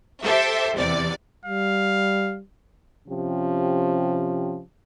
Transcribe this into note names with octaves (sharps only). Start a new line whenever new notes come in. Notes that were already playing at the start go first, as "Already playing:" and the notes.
G4 A4 C5 E5
E2 C3 D5
G3 F5
C3 F3 C#4 G4